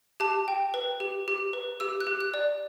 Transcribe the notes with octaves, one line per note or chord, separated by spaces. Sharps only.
G4 A5
G5
B4
G4
G4
B4
G4 E6
F#6
G4
F#6
D5